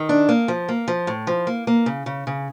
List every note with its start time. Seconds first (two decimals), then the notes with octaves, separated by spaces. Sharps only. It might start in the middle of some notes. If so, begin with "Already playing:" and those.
Already playing: D#3
0.09 D4
0.29 A#3
0.48 F3
0.69 A#3
0.88 F3
1.07 A2
1.27 F3
1.47 A#3
1.67 A#3
1.86 C#3
2.06 C#3
2.27 C#3